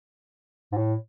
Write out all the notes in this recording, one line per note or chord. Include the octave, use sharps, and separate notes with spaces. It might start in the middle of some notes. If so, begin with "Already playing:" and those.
G#2
A2